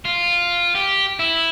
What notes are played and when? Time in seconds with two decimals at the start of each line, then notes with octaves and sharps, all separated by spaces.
0.05 F4
0.75 G4
1.19 E4